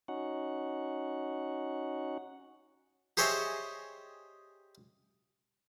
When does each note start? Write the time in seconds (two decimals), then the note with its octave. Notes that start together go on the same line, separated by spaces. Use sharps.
0.08 C#4 D#4 F#4 F#5
3.17 G4 G#4 C5 C#5 D#5 E5